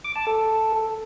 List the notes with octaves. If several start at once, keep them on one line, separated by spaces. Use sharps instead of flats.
D6
A5
A4